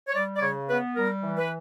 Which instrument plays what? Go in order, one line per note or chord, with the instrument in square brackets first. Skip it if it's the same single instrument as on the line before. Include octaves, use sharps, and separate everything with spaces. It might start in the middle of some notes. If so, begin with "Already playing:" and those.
[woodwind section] C#5
G3 D5
D5
C#3 C#5
B3 B4
G3 A#4
E3
B4